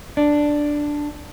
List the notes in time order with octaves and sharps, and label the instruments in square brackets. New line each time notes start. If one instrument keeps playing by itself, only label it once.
[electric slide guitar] D4